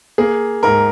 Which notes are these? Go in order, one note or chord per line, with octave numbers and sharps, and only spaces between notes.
A#3 G#4
G#2 A#4